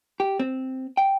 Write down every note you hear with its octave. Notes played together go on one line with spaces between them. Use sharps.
G4
C4
G5